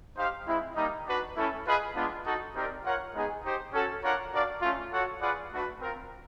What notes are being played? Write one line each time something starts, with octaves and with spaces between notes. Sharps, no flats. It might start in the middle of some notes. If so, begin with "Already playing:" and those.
D#4 G4 C5 F5
G#3 C4 E4
G3 A#3 D#4
D4 F#4 B4
A3 C#4 E4 A4
F4 G#4 B4 D#5
G#3 B3 D4 F4
D#4 F#4 A4
C4 D#4 G4 A#4 D5
F4 A#4 C#5 F#5
G#3 B3 D#4 G#4
D#4 G4 C5
C#4 F#4 A4
D4 F4 A#4 C#5 F#5
D4 F#4 A#4 D5 F5
A3 C#4 F4
F#4 A4 C#5 F#5
F4 G#4 B4 D5 F#5
A3 D4 F#4 B4
C4 F4 A#4